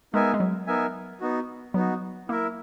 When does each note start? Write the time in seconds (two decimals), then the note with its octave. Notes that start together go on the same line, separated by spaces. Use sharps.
0.14 G#3 B3 D#4 A#4 E5 G#5
0.34 G#3
0.40 F#3
0.67 B3 D#4 A#4 E5 G#5
1.21 B3 D#4 F#4
1.74 F#3 B3 D#4 F#4
2.28 A#3 E4 A#4 E5